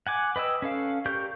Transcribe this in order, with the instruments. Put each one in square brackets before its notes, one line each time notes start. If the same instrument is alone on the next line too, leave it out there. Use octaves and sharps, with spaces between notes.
[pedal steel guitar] F#5 G#5 D6
B4 D#5 G5 E6
C#4 A4 F5
G4 A#4 D5 C#6 G6